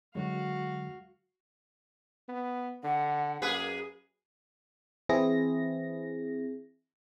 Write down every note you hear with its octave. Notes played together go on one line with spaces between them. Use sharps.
D3 F#3 G#3 F#4 F5
B3
D3 F#5
F#2 A#3 G#4 B4
E3 C4 E4 G#4 A#6